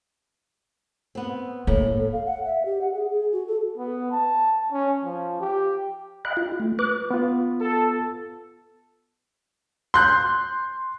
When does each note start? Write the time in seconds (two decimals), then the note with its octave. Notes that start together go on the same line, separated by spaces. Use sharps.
1.15 B3 C4
1.67 A2 A#3
1.98 A4
2.13 F5
2.26 F#5
2.45 E5
2.65 G4
2.81 F#5
2.94 G#4
3.11 G#4
3.32 F#4
3.47 A4
3.78 B3
4.11 A5
4.72 C#4
5.04 F3
5.40 G4
6.25 D#5 F5 G5 B5 F#6
6.37 F4
6.60 A3
6.79 B4 D6 F#6
7.11 B3 F4
7.60 A4
9.94 C6 F#6 G6